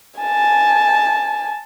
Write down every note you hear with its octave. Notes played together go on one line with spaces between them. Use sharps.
G#5 A5